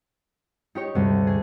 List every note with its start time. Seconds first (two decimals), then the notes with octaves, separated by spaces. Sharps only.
0.75 D#4 G4 C#5
0.95 D2 G2 C3 G3
1.27 G#4